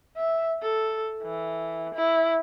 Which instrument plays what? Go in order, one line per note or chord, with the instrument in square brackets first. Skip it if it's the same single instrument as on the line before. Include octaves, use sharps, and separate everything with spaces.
[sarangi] E5
A4
E3
E4